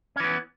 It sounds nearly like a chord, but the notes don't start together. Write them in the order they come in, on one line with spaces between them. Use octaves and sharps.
C#4 E3 B3